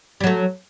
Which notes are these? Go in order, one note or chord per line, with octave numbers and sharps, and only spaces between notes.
F#3 G3 A3